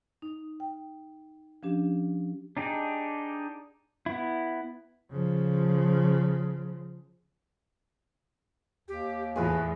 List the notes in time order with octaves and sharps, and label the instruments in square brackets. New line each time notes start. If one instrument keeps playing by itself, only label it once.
[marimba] D#4
G5
F3 C#4 D4 G4
[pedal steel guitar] D4 D#4 G4 G#4
B3 E4
[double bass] C#3 F3
[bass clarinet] D#2 [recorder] G4
[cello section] E2 A2 [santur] E4 F4 G#4 [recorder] B4